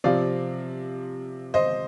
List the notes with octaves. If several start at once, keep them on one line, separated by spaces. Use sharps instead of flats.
C3 F3 C4 D5 F5
C5 D#5